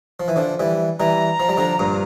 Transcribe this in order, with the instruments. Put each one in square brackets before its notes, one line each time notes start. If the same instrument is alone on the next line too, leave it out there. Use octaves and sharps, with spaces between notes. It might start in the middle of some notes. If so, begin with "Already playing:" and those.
[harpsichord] F3
E3
D3 F3
E3 G3
[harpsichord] E3 G3 [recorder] A#5
[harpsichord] F3
G3
D3 F3
G2 A#2